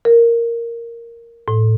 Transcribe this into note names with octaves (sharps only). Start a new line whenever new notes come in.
A#4
A2